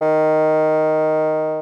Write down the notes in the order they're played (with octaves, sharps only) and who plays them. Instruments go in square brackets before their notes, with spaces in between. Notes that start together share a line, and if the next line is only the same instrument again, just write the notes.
[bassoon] D#3